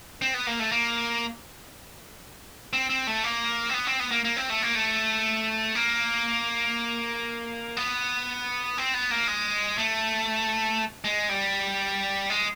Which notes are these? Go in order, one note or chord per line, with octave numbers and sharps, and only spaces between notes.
C4
B3
A#3
A3
A#3
C4
C4
A3
A#3
C4
B3
C4
B3
A#3
A#3
C4
A3
A#3
A3
A#3
B3
C4
B3
A#3
G#3
A3
G#3
G3
G#3